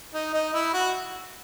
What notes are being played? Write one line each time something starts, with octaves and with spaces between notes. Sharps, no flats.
D#4
D#4
E4
F#4